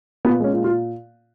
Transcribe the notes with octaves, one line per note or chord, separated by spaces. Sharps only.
A#2 B3
G#3 C#4
A#2
F4
A#2